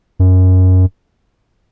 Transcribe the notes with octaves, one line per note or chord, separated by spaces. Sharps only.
F#2